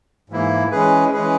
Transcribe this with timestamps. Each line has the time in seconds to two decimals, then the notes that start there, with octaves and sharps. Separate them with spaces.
0.30 G#2 E3 A#3 E4
0.71 E3 G#3 C#4 G#4 B4
1.13 E3 G#3 C#4 G#4 B4